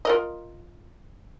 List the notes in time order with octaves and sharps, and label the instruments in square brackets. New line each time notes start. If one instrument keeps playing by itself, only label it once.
[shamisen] F4 A#4 D#5